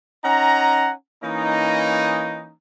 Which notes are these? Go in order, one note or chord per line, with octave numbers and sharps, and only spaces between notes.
C#4 D#4 F#5 G#5 A#5
E3 A#3 C#4 D#4